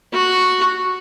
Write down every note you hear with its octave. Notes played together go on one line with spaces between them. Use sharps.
F#4